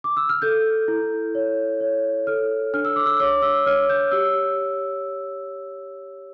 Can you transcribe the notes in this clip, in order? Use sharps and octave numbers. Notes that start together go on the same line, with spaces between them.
D6
E6
F6
A4 G6
E4
C#5
C#5
A4 F6
D4 F6
E6
D6
E6
C#5 D6
E6
C#5 F6
G6
G4 E6